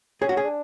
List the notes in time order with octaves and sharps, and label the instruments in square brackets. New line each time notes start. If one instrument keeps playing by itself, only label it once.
[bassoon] C#4 [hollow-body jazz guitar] G#4
[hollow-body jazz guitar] F#4
G#4
[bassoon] D4